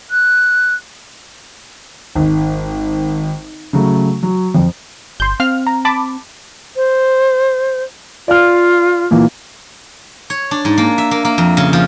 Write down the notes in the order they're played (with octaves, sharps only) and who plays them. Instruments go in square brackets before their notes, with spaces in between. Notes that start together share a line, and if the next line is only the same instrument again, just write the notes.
[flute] F#6
[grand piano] G#1
C#3 F#3 A3
F#3
F2
[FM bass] G1 [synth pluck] C6 G6
[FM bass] C4 [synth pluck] F5 F6
[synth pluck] A#5
A5 B5 D6
[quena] C5
[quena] F4 [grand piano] D5 F5 F6
[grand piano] A#2 E3 A#3
[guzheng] C#5
D4
G#2
A#3
E5
A#3
A#3
F2
C#3
F3